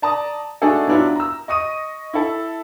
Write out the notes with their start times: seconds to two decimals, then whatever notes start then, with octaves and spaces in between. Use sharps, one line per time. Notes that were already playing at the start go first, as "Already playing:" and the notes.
0.02 D5 A5 A#5 D#6
0.62 A3 D4 D#4 F#4 G#4 A4
0.88 F#3 B3 D4 E4 F4
1.16 A#5 E6
1.48 D#5 C#6 D#6 D#7
2.13 E4 A4